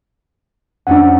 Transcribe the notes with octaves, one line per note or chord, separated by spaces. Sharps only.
F2 A3 C#4 D4 F#5